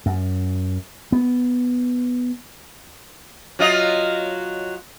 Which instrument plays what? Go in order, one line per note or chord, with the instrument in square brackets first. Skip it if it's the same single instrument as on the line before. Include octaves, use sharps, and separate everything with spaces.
[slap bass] F#2
B3
[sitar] F#3 F4 D#5